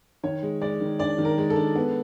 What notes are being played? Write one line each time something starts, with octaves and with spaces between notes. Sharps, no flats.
D#3 C#5
G#3
G#3 D5
D#3
D4 D5
D#3
A#4
G#3
A4
D4
B3